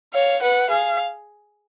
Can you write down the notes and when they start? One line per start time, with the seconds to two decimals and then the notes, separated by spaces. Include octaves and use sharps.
0.14 C#5 F5
0.42 B4 F#5
0.70 G#4 F5